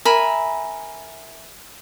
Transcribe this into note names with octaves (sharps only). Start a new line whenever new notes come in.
A#4 E5 G#5 B5